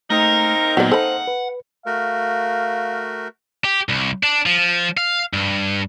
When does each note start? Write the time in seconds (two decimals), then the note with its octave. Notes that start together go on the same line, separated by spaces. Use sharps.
0.10 A3 A#3 C4 D#4 A#4
0.77 A#2 F#3 B3 F#4 D5
0.92 A4 C5 F#5 B5
1.27 B4
1.86 A3 F#4 A#4 F5
3.65 G4
3.89 C2
4.23 D4
4.46 F3
4.97 F5
5.33 G2